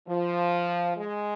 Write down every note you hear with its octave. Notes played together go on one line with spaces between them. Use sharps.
F3
G#3